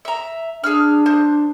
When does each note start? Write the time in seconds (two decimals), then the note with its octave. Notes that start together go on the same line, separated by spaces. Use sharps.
0.05 E5 A#5
0.64 D4 G#4 E6 F6
1.06 C5